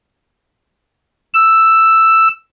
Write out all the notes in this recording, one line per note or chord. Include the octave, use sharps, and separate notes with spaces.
E6